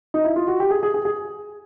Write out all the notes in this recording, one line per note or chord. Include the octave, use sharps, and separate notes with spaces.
D#4
E4
F4
F#4
G4
G#4
G#4
G#4
G#4